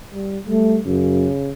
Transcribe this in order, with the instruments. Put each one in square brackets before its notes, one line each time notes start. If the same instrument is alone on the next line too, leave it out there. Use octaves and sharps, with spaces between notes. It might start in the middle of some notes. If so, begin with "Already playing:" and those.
[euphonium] G3
[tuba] G3 [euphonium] A3
[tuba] F#2 [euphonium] C#3